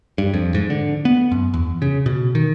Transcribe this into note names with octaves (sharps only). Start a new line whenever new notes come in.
G2
F2
G#2
D3
B3
F#2
E2
C#3
B2
D#3